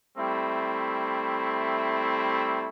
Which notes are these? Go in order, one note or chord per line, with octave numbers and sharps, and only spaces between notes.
G3 A3 C4 E4